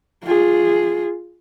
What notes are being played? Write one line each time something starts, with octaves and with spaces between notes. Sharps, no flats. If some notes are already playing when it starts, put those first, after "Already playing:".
F4 G#4